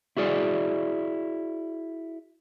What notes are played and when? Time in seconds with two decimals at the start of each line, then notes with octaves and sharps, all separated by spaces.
0.17 E4 F#4 G#4 D5